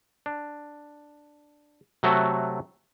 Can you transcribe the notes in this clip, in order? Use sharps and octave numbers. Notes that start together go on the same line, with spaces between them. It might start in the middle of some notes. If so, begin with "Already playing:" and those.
D4
C3 F#3 A3 F#4 A4